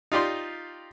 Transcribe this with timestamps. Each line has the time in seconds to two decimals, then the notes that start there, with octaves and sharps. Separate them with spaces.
0.12 D#4 F4 G4 D5 C6